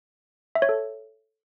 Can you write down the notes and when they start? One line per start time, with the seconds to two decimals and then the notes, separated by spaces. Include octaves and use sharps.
0.55 E5
0.62 C#5
0.69 A4